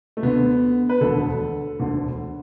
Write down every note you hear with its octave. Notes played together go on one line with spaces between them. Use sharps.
A3
D2 D3 B3
B4
E1 D2 D3 A4
E1 D2 D3